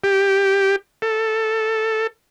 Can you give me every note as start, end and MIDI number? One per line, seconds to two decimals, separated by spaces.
0.04 0.76 67
1.02 2.07 69